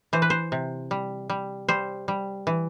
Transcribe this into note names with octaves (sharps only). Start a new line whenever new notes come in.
E3 C5
B4
C5
C3
G3
G3
G3 C5
G3
E3